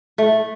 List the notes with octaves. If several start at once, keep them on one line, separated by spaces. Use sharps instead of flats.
A3